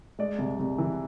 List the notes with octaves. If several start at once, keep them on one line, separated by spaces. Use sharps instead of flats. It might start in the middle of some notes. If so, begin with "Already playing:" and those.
G#3 D5
C2
C2
E3